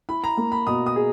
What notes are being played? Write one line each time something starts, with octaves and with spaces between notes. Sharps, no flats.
E4 B5
A#5
A#3
B5
B2 D#6
D#6
G#4